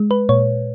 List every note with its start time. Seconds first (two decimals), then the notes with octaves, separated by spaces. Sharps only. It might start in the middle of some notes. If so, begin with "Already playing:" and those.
Already playing: G#3
0.11 B4
0.29 A#2 C#5